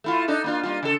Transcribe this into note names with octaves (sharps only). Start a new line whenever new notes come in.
A3 E4 F4
D4 D#4 A4
A#3 D4 F4
G3 A#3 F4
C#3 A4